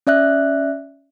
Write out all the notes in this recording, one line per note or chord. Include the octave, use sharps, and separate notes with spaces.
C#4 D5 E5 F#6